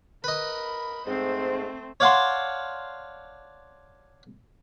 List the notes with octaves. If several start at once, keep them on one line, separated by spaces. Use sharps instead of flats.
A#4 B4 D#5 B5
G#2 A3 C4 C5
C#5 D5 F5 F#5 A5 C6